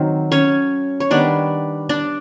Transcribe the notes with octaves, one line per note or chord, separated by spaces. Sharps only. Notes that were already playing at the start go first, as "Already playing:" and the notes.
Already playing: D#3 F#3 C4
C#4 C#5
C#5
D#3 G3 B3 D4 D5
D4 D5